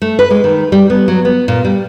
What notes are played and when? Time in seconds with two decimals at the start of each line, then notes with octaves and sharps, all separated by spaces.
0.02 A3
0.19 B4
0.30 G#3
0.44 D#3
0.72 G3
0.90 B3
1.08 F#3
1.25 B3
1.48 A#2
1.65 G3